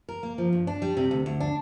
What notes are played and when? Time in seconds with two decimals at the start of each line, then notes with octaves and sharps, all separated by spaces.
0.09 A#4
0.23 A#3
0.38 F3
0.53 G2
0.67 D4
0.82 G3
0.97 C3
1.11 D2
1.26 D2
1.40 D4